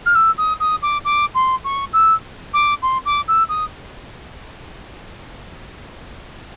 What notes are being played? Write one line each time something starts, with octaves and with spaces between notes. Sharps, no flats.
F6
E6
D#6
D#6
D6
D6
C6
C#6
E6
D6
C6
D6
E6
D#6